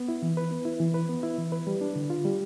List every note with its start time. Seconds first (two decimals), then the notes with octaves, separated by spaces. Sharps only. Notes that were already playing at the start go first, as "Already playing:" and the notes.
Already playing: B3
0.08 E4
0.22 E3
0.37 B4
0.51 B3
0.65 E4
0.80 E3
0.94 B4
1.09 B3
1.23 E4
1.38 E3
1.52 B4
1.67 G3
1.81 D4
1.96 D3
2.10 F4
2.25 G3